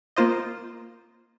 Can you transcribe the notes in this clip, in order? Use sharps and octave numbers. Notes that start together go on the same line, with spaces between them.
A#3 F4 C5 D#5